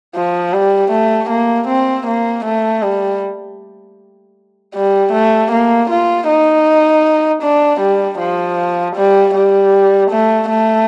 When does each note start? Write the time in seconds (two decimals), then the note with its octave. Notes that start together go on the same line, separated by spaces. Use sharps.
0.15 F3
0.52 G3
0.91 A3
1.29 A#3
1.67 C4
2.07 A#3
2.45 A3
2.82 G3
4.74 G3
5.12 A3
5.51 A#3
5.90 F4
6.28 D#4
7.42 D4
7.81 G3
8.19 F3
8.96 G3
9.34 G3
10.10 A3
10.50 A3